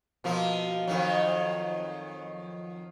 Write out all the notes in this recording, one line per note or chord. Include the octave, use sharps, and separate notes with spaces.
B2 F3 A#3
F2 D#3 F#3